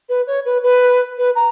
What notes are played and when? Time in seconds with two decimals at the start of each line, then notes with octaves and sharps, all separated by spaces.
0.09 B4
0.27 C#5
0.45 B4
0.63 B4
1.18 B4
1.35 A#5